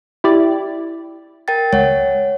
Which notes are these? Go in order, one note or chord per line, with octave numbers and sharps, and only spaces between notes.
E4 G4 D5
A#4 G5 A6
C#2 C#5 F#5